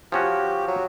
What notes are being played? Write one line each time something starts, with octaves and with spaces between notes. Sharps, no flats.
F3 C#4 F#4 G4
F#3